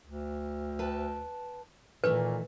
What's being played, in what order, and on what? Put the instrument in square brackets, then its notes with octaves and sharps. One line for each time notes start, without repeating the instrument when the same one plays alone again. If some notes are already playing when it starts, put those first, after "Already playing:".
[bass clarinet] D2
[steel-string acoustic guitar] B4 G5 A5
[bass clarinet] A#2 [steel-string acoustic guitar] D#3 E3 A3 [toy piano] B4